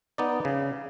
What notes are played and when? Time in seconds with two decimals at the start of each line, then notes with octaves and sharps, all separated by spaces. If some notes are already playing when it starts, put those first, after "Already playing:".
0.18 B3 D#4 D5
0.45 C#3